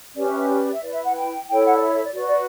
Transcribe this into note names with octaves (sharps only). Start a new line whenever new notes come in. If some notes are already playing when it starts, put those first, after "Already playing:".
C#4 G4 B4 D5
E5
E5
D5
E5
E4 B4 D5
E5
F#5
G5
E4 A4 C#5 G5
F#5
D5
E5
E5
D5
F#4 B4 D5
D5